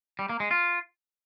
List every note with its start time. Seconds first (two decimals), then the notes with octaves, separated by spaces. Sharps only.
0.19 G3
0.29 A#3
0.40 G#3
0.51 F4